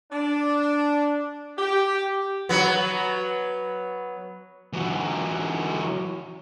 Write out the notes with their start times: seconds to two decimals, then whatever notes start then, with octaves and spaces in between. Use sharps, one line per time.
0.11 D4
1.58 G4
2.49 F#3 B3
4.73 E3 F#3